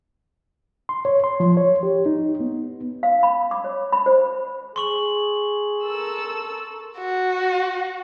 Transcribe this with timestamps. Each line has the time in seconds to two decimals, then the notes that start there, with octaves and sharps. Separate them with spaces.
0.89 C6
1.05 C#5
1.24 C6
1.40 F3
1.57 C#5
1.83 G4
2.06 D#4
2.40 B3
3.03 F5
3.23 B5
3.51 D6
3.64 C#5
3.92 B5
4.06 C5
4.76 G#4 C6 C#6 F#7
5.84 A4 A#4 E6
6.98 F#4